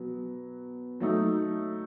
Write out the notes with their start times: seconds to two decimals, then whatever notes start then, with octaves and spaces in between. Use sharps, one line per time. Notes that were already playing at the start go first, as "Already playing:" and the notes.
Already playing: B2 F#3 B3
1.00 F#3 A3 D#4